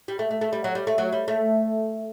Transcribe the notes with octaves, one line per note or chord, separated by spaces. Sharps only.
G3
A3
A3
A3
G3
F#3
G3
A3
F#3
G3
A3